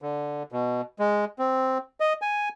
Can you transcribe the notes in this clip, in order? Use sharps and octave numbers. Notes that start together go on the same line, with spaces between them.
D3
B2
G#3
C4
D#5
G#5